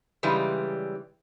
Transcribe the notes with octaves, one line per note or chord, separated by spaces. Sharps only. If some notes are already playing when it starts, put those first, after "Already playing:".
C#3 E3 G3 G#3